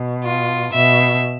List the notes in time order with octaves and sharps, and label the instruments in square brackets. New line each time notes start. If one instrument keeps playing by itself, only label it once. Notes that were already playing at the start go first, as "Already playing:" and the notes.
Already playing: [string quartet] B2
[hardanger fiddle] F4
[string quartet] B2 [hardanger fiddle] E5